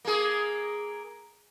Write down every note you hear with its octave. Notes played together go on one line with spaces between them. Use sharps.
A#3 G#4